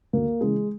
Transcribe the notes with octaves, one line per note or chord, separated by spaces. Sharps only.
D2 A#3
C#3 E3 G#3